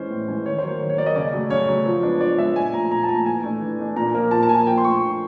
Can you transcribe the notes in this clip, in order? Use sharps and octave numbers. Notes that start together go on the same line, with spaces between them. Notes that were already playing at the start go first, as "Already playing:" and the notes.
Already playing: E3 G#3 C#4 C5
A2
E3 G#3 C#4
D#3 C#5
C5
F#3 A#3 C#5
D#3
C#5
F#3 A#3 D5
D#5
C#3 D5
F#3 A3
C#3 C#5
F#3 A3
F3
G#3 B3 D4
F3 D5
G#3 B3 D4 E5
A#2 G#5
F3 A3 A#5
A#2 A#5
A5
F3 A3 A#5
E3 G#5
A3 D4
E3
A3 D4
A#2 A#5
F3 A#3
A#2 A5
A5
F3 A#3 G#5
F3 G5
C6
A3 D4 C#6
F3